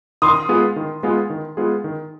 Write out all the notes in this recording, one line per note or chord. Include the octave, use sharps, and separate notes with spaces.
D#3 C6 D#6
G#3 B3 F4 G#4
D#3
G#3 B3 F4 G#4
D#3
G#3 B3 F4 G#4
D#3